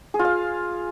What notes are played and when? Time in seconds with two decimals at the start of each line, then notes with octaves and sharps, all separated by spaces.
0.14 G#4
0.19 F4
0.25 F5